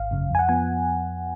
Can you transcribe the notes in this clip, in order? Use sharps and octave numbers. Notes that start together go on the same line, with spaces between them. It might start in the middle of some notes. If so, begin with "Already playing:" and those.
Already playing: G#1 F5
F#2 C#3
F2 G#5
F#5
F3 B3 G#5